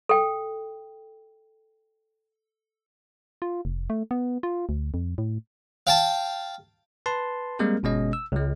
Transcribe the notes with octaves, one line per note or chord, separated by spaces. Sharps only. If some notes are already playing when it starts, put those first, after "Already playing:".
A4 G5
F4
F1
A3
B3
F4
D2
F2
A2
F5 G5 A5
B4 A5 C6
G3 G#3 A#3 C4 A#4
G1 B2 G#3 C#4 D#5
E6
C#2 G#3